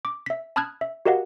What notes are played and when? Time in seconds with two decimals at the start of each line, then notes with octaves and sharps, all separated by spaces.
0.05 D6
0.26 E5 B6
0.56 A5 B5 D#6 F6 F#6 G#6
0.81 E5
1.05 F#4 G4 A#4 D#5 F5 F#5